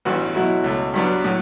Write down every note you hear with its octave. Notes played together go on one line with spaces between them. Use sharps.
A1 G2 E3 B3 F#4
B2 F#3 A3 E4
C#2 B2 A3
G2 F#3 B3 D4
A2 F#3